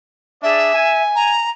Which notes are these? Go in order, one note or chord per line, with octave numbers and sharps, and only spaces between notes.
D4 G#4 D5 E5
G#5
A#5